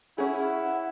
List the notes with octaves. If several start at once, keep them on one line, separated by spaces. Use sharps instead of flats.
C#4 E4 G#4 F#5